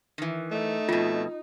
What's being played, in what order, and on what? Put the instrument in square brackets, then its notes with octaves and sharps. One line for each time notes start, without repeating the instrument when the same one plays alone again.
[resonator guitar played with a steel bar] D#3 E3
[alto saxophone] A3 [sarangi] D#4
[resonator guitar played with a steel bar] F2 B2 [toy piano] F4